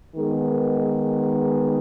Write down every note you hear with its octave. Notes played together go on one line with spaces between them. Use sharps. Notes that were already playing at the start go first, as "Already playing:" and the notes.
D#3 G#3 B3